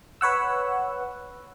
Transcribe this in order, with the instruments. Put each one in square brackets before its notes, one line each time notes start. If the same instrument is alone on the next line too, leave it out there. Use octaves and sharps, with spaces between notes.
[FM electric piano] B4 C#5 F#5 E6